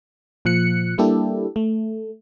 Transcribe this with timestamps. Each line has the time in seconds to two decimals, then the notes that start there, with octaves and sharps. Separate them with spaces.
0.45 A#2 F3 F#6 C#7
0.98 G3 A#3 D4 E4 G4 A4
1.56 A3